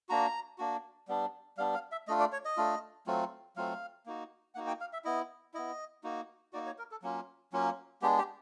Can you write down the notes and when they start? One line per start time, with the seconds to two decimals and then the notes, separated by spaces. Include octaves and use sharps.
0.09 A#3 D4 F#4 A#5
0.58 A#3 D4 F#4
1.08 G3 B3 D4
1.58 G3 B3 D4 F5
1.74 F5
1.92 E5
2.08 A3 D4 F4 D#5
2.20 D5
2.32 C#5
2.45 D#5
2.57 A3 D4 F4
3.07 F#3 A3 C4 F4
3.56 F#3 A3 C4 F4 F5
4.06 A#3 D#4 F#4
4.55 A#3 D#4 F#4 F#5
4.67 G5
4.81 F5
4.93 E5
5.05 B3 E4 D#5
5.54 B3 E4 D#5
6.04 A#3 D#4 F#4
6.53 A#3 D#4 F#4 D5
6.66 C#5
6.78 A#4
6.91 A4
7.03 F#3 A#3 C#4 F4
7.52 F#3 A#3 C#4 F4
8.02 G#3 B3 D4 G4
8.18 G4